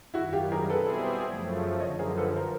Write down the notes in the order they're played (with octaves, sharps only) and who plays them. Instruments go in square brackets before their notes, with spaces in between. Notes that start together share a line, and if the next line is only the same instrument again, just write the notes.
[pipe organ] F#2 D#3 G3 [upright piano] E4 F#4
[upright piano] F4 G4
G#4 A#4
[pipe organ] B2 G3 C4 E4 G#4 [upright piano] A4 B4
[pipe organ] F#2 C#3 F3 A3
[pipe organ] F#2 D3 F3 [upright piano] C#5 D#5
[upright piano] G#4 A#4
A4 B4
A#4 C5